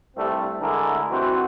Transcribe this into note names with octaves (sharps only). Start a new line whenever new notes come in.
C2 G2 G3 A3 C4 D4
D3 G#3 A3 E4 G#4 A#4
C2 E3 C4 F#4